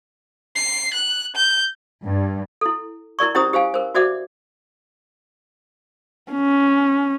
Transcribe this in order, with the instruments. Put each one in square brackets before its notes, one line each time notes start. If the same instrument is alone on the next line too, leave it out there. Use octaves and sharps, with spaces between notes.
[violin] C7
F#6
G6
[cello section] G2
[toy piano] E4 A4
E4 A#4 D5 C#6
C#4 E4 G4 C5 A#5 D#6
G4 C5 F5 G#5
A#4 C5
F#4 C5 D5 E5 F#5 D6
[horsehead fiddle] C#4